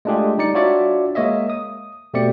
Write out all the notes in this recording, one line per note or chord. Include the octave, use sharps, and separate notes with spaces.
G#3 A3 D4 F4 G4 G#4
G3 D#4 D5 C#7
D4 F4 F#4 C#5 D5 E5
G#3 A#3 C#5 D#5 E5
D#6
B2 A3 C4 G4 D5 C#7